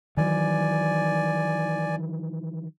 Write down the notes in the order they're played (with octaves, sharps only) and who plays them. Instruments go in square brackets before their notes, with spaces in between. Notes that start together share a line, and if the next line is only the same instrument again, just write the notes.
[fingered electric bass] D#3 E3 F#3 [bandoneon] D5 G#5